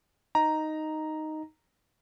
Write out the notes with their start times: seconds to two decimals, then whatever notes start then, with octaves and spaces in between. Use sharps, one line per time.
0.35 D#4 A#5